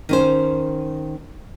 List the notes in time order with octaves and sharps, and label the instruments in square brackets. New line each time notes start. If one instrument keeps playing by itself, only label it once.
[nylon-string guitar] D#3 C#4 C5